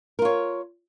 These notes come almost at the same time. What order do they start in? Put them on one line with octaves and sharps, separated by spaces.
A#4 F4 C#5